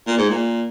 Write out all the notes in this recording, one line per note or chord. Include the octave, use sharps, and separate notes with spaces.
A#2
G#2
A#2